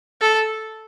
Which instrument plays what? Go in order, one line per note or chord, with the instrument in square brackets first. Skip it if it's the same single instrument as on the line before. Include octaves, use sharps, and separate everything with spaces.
[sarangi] A4